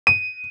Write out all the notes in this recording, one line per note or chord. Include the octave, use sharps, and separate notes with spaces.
D#7